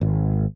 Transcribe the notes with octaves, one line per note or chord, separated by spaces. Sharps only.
G#1